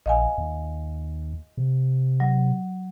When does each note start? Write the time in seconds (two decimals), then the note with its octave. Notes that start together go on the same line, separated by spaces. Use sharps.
0.06 A#1 D#5 F5 G#5
0.38 D#2
1.57 C3
2.20 F#3